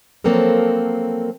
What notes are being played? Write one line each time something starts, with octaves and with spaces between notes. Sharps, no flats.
F3 F#3 A#3 C4 A4 A#4